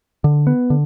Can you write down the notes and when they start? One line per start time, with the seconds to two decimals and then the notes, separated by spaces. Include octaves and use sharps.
0.24 D3
0.47 B3
0.70 D3